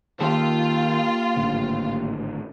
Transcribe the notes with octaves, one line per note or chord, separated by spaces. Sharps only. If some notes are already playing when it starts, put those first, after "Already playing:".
D#3 A#3 F4 G4 A4
G#1 A2 D3